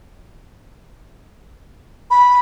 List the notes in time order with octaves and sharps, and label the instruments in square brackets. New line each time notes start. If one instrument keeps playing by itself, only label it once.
[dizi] B5